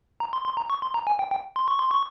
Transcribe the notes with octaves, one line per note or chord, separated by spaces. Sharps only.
A#5
C6
C6
A#5
C#6
C6
A#5
G#5
G5
G5
C6
C#6
C6
C#6